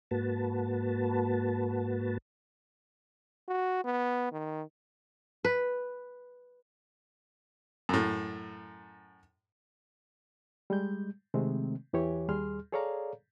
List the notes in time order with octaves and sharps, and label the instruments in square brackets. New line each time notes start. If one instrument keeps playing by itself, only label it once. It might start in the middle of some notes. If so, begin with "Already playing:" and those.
[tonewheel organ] G#2 A#3 F#4 B4 A5
[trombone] F#4
B3
D#3
[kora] B4
[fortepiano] F#2 A2
[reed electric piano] G3 G#3 G6
C3 D#3 G#3 A3 C4
E2 E3 G4 C#5
D#2 G3 G#4 C6 F6
G#4 A4 C#5 D5 F5 A#5